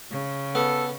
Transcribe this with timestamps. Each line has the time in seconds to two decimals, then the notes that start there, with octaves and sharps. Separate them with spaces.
0.11 C#3
0.55 B3 A4